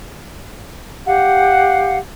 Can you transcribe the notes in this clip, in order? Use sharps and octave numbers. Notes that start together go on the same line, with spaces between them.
G4 F5 F#5